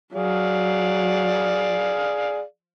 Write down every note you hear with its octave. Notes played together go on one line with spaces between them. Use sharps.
F#3 G#4 D5 F5